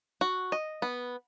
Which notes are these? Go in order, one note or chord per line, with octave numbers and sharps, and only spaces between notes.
F#4
D#5
B3